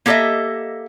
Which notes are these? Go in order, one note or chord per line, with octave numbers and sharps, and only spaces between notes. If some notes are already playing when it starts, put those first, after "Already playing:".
A#3 G4 A4 C#5 D#5 E5